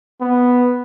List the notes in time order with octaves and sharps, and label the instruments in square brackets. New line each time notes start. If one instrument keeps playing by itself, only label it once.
[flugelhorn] B3